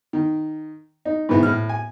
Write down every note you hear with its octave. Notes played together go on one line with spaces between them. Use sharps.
D#3
D#4
G#2 B2 D#3 E3 B3 E4
A2 F6
G#5